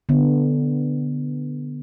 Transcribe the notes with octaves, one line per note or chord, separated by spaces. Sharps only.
D3 B3